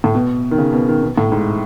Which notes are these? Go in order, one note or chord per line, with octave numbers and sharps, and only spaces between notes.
A2
B2
D#3
C#3
B2
D#3
B2
A2
G#2